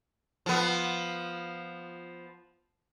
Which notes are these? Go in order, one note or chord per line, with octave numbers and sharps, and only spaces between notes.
F3 B3